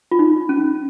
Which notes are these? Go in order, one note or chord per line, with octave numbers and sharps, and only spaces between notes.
F4
D#4
C#4